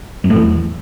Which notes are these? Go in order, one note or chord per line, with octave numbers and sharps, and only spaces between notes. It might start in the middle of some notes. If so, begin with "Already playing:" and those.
F#2
A2
E2